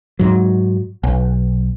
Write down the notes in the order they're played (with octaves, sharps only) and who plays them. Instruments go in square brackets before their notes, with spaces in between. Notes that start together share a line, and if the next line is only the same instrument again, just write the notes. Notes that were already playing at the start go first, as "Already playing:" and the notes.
[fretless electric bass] G#2 F#3
B1